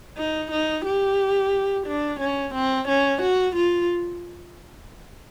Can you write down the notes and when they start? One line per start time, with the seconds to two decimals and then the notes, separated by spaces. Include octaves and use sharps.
0.18 D#4
0.52 D#4
0.85 G4
1.87 D4
2.20 C#4
2.54 C4
2.88 C#4
3.22 F#4
3.56 F4